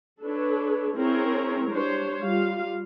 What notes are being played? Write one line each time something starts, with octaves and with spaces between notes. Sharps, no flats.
D4 A4 B4 C#5
C4 C#4 E4 G#4 A#4 C#5
G3 D4 C5 C#5
G3 F4 F5